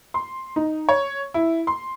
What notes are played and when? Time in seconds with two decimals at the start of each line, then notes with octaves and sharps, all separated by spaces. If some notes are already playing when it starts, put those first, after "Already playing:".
0.14 C6
0.56 D#4
0.89 C#5
1.34 E4
1.67 C6